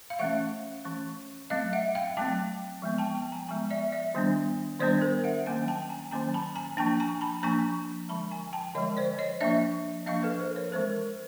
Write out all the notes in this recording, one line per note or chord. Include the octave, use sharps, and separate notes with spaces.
F5
E3 A3 C#4 E5 F#5
E3 A3 C#4
F#3 A3 C4 D#5 F5
E5 F#5
F5 G5
F#3 A3 C4 G5 A5
F3 G#3 B3
G5 A5
G5 A5
G#5 A#5
F3 G#3 B3 G#5 A#5
D5 E5
D5 E5
D#3 G3 B3 D4
D#3 G3 B3 D4 C5 D5
A#4 C5
E5 F#5
D#3 F#3 A#3 C#4 F#5 G#5
G5 A5
A5
G#5 A#5
D#3 F#3 A#3 C#4 G#5 A#5
A5 B5
G#5 A#5
F3 A#3 D4 G5 A5
G#5 A#5
A5 B5
F3 A#3 D4 G#5 A#5
D3 F3 G#3 A5 B5
G#5 A#5
G5 A5
D3 F3 G#3 C#5 D#5
C5 D5
C#5 D#5
F3 A#3 D4 D5 E5
F3 A#3 D4 D#5 F5
A4 B4
A#4 C5
B4 C#5
E3 G#3 C4 A#4 C5